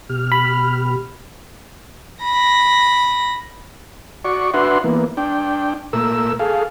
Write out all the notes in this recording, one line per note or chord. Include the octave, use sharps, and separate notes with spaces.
B2 G4 F6
B5
B5 A#6
F#4 D5 C#6
D4 F#4 B4 E5 F#5 C6
E3 A#3 B3
D4 G5
A#2 A3 A#4 E6
G#4 A4 F5